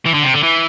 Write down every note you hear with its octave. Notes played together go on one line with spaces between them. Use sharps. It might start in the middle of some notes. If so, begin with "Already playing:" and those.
E3
D3
C3
D3
E3